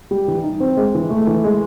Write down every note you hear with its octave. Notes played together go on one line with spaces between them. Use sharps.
G3
E3
D#4
C4
G#3
E3
A3
E3
G#3